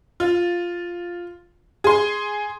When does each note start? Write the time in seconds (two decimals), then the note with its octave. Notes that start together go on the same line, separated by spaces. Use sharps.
0.20 F4
1.84 G#4 C6